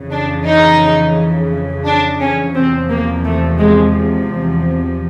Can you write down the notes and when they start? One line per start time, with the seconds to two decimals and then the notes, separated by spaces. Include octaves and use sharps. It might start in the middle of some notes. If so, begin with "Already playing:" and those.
Already playing: F2 C#3 E3
0.11 D4
0.47 D#4
1.85 D4
2.21 C#4
2.55 E2 C3 F3 C4
2.90 A#3
3.25 A3
3.60 G#3